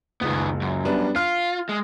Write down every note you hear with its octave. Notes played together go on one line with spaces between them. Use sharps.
F#1 C#2 D#3 B3
F#2
G3 B3 D4
F4 F6
G#3